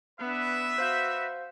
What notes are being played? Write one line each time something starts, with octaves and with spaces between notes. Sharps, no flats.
B3 D4 B4 E5
F#4 C5 F5 G6